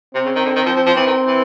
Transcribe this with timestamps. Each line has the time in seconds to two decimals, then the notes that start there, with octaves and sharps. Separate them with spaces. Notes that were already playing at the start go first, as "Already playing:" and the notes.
0.15 C3 C4
0.25 C#3
0.35 D#3
0.45 D3
0.56 D#3
0.66 F3
0.76 F3
0.86 F3
0.96 E3 C4
1.06 D#3
1.27 E3